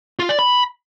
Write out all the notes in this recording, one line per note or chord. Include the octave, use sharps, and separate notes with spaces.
F4
D5
B5